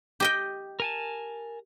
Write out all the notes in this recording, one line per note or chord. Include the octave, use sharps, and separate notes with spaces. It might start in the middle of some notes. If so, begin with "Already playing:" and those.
G4 D#5 G5
A#4 G#5 A5